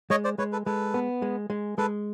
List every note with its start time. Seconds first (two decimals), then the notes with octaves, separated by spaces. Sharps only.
0.10 G#3 C#5 D#5
0.24 C5 D5
0.38 G#3 B4 C#5
0.52 A4 B4
0.66 G#3 A4 B4
0.94 B3
1.22 G#3
1.50 G#3
1.78 G#3 A4 B4